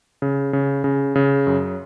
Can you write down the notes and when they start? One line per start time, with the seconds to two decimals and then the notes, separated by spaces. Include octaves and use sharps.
0.22 C#3
0.53 C#3
0.84 C#3
1.15 C#3
1.47 F#2